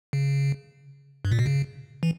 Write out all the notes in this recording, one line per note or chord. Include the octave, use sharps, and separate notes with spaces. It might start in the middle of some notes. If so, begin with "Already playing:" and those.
C#3
G2
A#2
B2
C#3
E3